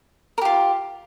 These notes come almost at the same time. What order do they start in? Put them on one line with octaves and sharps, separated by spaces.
A#4 G4 F4